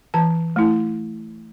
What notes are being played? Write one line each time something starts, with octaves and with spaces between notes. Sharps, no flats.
E3 A5
A3 E4